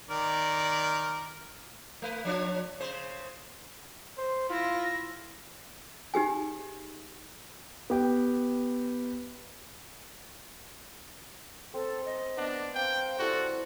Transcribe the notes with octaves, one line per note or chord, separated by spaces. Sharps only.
D#3 A#4 D5
A3 B4
F3 D4 C#5
C#3 C5
C5
E4 F4 A#6
D#4 G4 G#4 G#5
B3 G4 G5
C4 A4
D#5
B3 D4
C4 A#4 F5 G5 E6
G3 E4 F#4 A4 C5